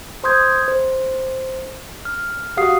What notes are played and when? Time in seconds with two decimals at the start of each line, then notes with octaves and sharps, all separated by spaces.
0.24 C5 C6 D#6 G6 G#6
0.68 C5
2.05 F6
2.57 F#4 G4 F5 F#5 D#6 C7